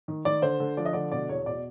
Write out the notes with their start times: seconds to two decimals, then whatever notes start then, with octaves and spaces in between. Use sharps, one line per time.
0.08 D#3
0.25 D#3 D5
0.42 D3 C5
0.60 D3
0.77 F3 D5
0.85 D#5
0.93 D3 D5
1.12 B2 D5
1.29 E2 C#5
1.46 B2 D5